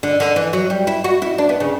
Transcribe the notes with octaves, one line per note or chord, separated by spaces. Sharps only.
D3
D3
E3
F#3
G3
E4
F#4
E4
D4
B3
C#3